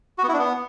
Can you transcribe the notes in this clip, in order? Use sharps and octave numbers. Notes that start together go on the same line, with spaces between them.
F#4
B3
E4
D4
B3